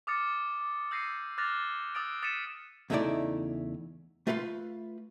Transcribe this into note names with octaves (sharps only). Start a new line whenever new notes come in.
D6 D#6 F6 A6 C#7
D6
E6 G6 A#6 C7 C#7 D#7
D6 F6 F#6 A6 A#6 F7
D#6 E6 A6 D7
D#6 A6 B6 C#7 D#7 E7
E2 C#3 A3 D#4 E4 D5
A3 F4 B4 F5 C6